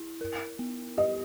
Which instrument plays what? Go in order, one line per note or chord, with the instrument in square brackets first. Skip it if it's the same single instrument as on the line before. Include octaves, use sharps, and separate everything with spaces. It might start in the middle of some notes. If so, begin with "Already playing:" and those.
Already playing: [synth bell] E4
A#4
B3
[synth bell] G4 [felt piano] D#5